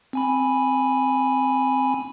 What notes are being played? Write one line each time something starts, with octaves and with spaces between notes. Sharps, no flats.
C4 G#5 B5